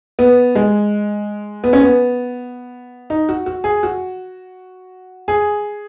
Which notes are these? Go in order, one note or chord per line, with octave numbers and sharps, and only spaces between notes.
B3
G#3
B3
C#4
B3
D#4
F#4
F#4
G#4
F#4
G#4